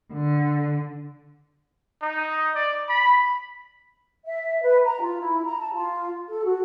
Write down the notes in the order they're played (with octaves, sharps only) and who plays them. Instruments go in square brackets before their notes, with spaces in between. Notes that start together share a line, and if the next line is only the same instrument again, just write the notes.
[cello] D3
[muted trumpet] D#4
D5
B5
[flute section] E5
B4
A#5
F4
E4
A#5
A5
F4
A4
F#4